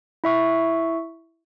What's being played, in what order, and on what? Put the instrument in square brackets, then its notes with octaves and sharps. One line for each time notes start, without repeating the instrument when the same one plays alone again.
[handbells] E4 E5 C#6